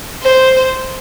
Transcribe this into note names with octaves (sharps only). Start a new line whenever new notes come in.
C5